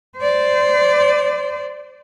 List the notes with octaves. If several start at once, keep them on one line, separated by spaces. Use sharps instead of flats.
C5 D5